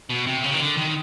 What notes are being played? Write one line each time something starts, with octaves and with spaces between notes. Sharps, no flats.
B2
C3
C#3
D#3
D3
D#3